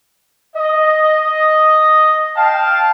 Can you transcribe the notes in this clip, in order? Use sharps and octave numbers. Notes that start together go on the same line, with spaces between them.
D#5
F5 G5 A5